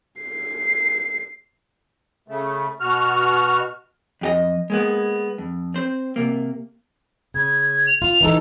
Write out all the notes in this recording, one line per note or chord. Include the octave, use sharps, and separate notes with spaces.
C7
C#3 A3
B2 F#4 F6
F2 G4 D#5
G#3 A#3 B3
F2
C4 C5
C3 A#3
C#3 G#6
F7
F4
E3 D#4 A4